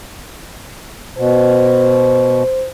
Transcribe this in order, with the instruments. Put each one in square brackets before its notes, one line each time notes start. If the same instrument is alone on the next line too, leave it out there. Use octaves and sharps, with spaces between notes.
[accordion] B2 [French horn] C5